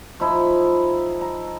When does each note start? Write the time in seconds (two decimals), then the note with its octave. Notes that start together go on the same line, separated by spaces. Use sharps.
0.20 F3 D#4 E4
1.21 A#5